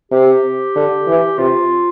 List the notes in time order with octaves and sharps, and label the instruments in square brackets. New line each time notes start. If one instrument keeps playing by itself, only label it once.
[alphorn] C3 [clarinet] G4
[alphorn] D3
E3
[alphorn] C3 [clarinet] F4